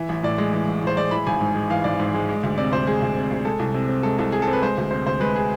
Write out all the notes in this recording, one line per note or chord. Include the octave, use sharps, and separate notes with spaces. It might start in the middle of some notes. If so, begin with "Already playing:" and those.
Already playing: E3 E5
A1
A2 D5
G#3
E3
A1
A2 C5
G#3 D5
E3 B5
G#1 G#5
G#2
G#3
E3 F5
G#1 D5
G#2
G#3
G#3
D2
C3 D5
D2 C5
G#3 G#4
D2
C3
D2
G#3 A4
C2
C3
C4
G#3 A4
C2 A4
C3 G#4
A4
C4
B4
G#3 C5
D2
C3 C5
D2 C5
G#3 B4
G#4